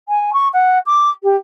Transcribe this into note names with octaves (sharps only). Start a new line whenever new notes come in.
G#5
C#6
F#5
D6
G4